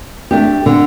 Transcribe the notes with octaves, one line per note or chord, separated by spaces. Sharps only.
A3 D4 G4
D3